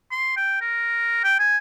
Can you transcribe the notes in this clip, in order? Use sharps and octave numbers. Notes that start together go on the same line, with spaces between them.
C6
G5
A#4
G5
G#5